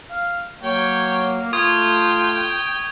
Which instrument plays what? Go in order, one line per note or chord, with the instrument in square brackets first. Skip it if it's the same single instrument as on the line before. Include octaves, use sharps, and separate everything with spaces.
[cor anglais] F5
[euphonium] F#3 [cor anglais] A#3 [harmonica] C#5 G5
[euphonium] A3 [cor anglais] F4 [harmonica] G5 [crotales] C#6 D#6 G#6